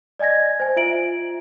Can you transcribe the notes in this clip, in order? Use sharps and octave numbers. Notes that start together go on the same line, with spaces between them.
D5 D#5 G#5 G#6 A#6
C5 G#5
F4 E5 D7 F#7